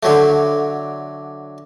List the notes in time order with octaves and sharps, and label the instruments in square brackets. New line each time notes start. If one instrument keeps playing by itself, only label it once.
[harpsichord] D3 F#3 A3